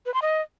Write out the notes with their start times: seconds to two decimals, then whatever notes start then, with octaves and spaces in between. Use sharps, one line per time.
0.06 B4
0.14 C6
0.22 D#5